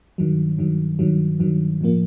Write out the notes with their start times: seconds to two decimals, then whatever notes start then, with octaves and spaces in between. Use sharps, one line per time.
0.18 G2 D#3 F#3
0.59 G2 D#3 F#3
0.99 G2 D#3 F#3
1.40 G2 D#3 F#3
1.81 A2 F3 A#3